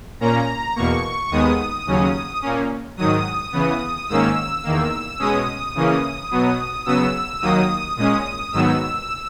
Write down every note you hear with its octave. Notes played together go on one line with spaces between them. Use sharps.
A#2 A#3 C#4 A#5
E2 B2 A#3 C#6
D#2 D#3 G#3 B3 D#6
D#2 C#3 F#3 C#4
A#2 A#3 C#4
G#2 D#3 F#3 D#6
C#3 E3 B3
G#2 D#3 A#3 C#4 E6
E2 D#3 A#3
B2 G#3 C#4 D#6
C#3 E3 A#3 C#4
B2 F#3 B3
C#3 F#3 B3 E6
D#2 D#3 F#3 A#3 D#6
A#2 G#3 C#4 D#6
G#2 D#3 F#3 B3 E6